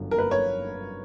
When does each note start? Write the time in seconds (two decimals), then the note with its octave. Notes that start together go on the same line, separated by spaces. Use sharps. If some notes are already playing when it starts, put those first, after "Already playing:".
Already playing: G1 F#2 D3
0.11 A#4
0.18 B4
0.31 C#5